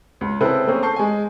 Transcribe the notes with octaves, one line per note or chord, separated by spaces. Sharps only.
C#2
C#3 C4 E4 A4 B4
A3 A#3 C4 C#4 G#4
A5 C#6 G6 C7
G#3 G#5